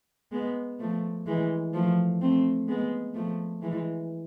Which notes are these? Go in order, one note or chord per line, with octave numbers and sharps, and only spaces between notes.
G#3 B3
F3 A3
E3 G#3
F3 A3
A3 C4
G#3 B3
F3 A3
E3 G#3